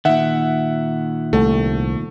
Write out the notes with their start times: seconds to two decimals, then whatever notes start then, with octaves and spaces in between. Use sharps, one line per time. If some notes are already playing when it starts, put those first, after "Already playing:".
0.05 A#2 D#3 E5 F#5
1.33 C2 A3